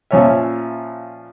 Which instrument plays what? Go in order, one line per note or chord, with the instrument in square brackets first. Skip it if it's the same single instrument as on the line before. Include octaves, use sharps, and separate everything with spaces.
[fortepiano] A#2 F3 C#4 C#5 E5